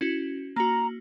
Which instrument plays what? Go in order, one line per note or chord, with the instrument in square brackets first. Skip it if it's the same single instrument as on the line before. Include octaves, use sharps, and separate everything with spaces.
[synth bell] C#4 E4 F#4
[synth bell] A#3 F#4 [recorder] A#5